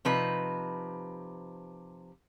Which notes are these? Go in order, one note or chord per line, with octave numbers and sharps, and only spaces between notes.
C3 F3 D#4 B4